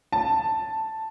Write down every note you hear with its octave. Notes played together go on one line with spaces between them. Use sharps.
A5